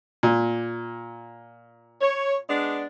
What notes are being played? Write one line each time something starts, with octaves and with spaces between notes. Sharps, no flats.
A#2
C#5
G#3 B3 D4